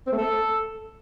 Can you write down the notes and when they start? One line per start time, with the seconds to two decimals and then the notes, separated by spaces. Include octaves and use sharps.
0.07 C4
0.12 A3
0.18 A4